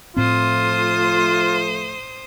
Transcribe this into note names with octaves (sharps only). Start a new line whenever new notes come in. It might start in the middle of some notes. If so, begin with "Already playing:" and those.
A2 F3 A3 C4 F4 C5 D#6